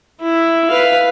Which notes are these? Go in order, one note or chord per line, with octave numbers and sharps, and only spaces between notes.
E4
B4 F5